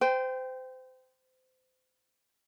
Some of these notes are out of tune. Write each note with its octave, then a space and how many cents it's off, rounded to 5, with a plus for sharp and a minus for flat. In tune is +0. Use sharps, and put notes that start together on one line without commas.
C5 -30 G5 +0